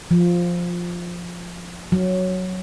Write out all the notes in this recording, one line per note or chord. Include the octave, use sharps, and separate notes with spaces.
F3
F#3